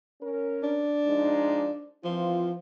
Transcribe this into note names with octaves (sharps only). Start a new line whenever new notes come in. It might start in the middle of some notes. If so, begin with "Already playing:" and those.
C#4 A#4
D4
F3 G#3 D#4
E3 F3 C4 F4